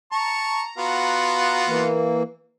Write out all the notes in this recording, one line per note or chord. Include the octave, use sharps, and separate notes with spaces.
A5 A#5 C#6
B3 F4 F#4
E3 A#3